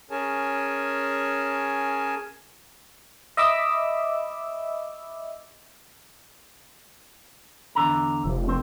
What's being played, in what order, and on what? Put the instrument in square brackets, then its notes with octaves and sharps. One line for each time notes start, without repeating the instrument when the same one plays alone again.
[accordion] C#4 G#4 A#4 C#5 G#5 A5
[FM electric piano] D#5 E5 B5 D6 E6
[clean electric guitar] E2 D3 A#5
[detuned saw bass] F1
[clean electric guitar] C4